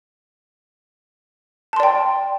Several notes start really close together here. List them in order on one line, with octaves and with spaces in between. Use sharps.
A5 C6 D5 G5